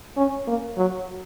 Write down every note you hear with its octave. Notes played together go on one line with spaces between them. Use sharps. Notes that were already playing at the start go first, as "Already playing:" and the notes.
C#4
A#3
F#3